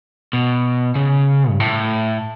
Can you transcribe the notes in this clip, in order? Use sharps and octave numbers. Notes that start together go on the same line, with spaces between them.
B2
C#3
G2
A2